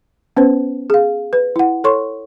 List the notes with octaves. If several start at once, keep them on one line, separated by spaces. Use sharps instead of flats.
B3 C#4 B4 C5
G#4 F5
B4
E4 F#5
A4 C#5 C6 C#6